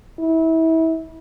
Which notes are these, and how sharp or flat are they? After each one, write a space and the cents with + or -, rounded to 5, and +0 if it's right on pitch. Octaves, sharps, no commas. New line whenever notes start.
E4 -30